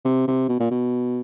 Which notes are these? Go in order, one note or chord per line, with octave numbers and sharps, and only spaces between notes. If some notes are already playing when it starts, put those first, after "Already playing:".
C3
C3
B2
A#2
B2